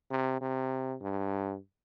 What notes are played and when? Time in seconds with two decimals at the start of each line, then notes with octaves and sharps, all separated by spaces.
0.11 C3
0.41 C3
1.01 G2